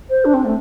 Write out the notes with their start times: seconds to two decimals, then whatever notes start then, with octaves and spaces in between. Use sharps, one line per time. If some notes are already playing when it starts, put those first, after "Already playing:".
0.10 C5
0.25 D4
0.33 C4
0.44 A3